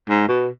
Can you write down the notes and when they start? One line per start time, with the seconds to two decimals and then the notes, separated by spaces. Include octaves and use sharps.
0.10 G#2
0.28 B2